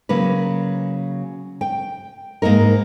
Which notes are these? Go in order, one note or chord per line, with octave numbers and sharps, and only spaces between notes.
C#3 F#3 A#3 B4
G5
G#2 A#3 B3 D#4 A#4